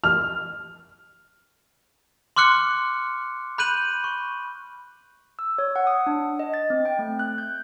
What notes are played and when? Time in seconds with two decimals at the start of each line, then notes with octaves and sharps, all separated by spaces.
0.04 F6
2.36 C6 D6 F6 F#6 C#7
3.58 B5 F#6 G6 D#7 F#7
4.04 C#6
5.39 E6
5.58 C#5
5.76 F#5
5.87 D#6
6.07 D4
6.40 D#5
6.54 A6
6.70 C4
6.85 G5
6.99 A3
7.19 F#6
7.38 G6